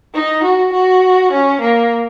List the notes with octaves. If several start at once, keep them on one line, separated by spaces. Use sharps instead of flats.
D#4
F#4
F#4
C#4
A#3